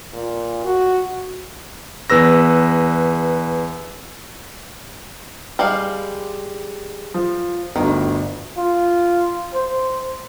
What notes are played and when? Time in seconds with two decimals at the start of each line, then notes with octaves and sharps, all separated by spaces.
0.13 A#2
0.65 F#4
2.10 E2 B4 E6 A#6
5.59 G3 G#3 F5
7.14 F3
7.76 G1 D2 D#3
8.57 F4
9.54 C5